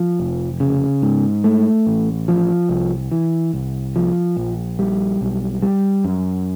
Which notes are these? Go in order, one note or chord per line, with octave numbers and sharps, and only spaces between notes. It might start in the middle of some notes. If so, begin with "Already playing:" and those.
Already playing: F3
F1
C#3
G#2
A3
A1
F3
C2
E3
C2
F3
A#1
G3
B1
G3
F#2